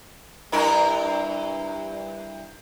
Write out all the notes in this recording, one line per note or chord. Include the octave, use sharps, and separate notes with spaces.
G2 E4 A#4